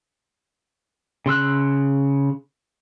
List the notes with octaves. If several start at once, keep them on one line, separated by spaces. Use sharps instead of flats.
C#3 C6 E6 F#6